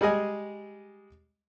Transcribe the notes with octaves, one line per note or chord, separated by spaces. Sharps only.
G3 G#3 G#4 D#5 G#5